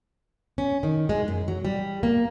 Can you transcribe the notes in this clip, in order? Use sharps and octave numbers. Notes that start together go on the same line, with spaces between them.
C#4
D#3
G#3
F#2
F#3
G3
A#3